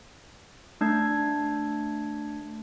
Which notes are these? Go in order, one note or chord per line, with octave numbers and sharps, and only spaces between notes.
A3 D4 G#6